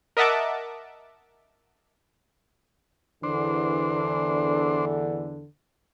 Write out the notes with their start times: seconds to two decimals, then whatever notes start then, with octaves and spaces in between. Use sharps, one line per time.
0.17 A#4 D#5 E5 F#5 A5 D6
3.23 E2 D3 E3 D4 C5